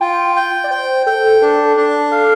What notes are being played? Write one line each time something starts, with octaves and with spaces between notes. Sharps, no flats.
F4 G5
G5
D5
C5 G5
A4 G5
D4 A4
D4
A4 F5